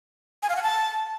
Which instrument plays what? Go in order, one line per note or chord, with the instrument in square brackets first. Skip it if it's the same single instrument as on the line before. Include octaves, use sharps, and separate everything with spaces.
[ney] G#5
F5
F#5
A5